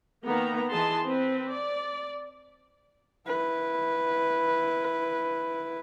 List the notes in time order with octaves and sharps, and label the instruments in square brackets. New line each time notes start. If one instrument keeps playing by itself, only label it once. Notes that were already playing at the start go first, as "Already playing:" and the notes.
[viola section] D#3 A#3 B3 A#5
E3 G#4 D#5 A5 C6
C4 B4
D5
[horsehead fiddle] E4 B4